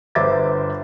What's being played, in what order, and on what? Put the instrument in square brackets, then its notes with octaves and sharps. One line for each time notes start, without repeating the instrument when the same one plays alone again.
[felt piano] G1 B4 C5 E5 D6 A6